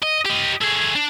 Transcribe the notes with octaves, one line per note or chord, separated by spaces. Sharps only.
D#5
G4 D#5
A3 G#4
D4